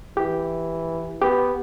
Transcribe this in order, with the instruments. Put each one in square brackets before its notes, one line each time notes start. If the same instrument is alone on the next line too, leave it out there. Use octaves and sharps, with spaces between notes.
[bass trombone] E3 [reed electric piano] G4
[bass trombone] B3 [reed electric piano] G4